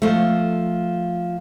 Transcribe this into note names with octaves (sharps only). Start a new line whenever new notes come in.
F3 A3